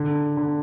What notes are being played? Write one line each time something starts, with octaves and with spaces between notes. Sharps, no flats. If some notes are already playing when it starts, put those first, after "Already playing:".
Already playing: D3
D3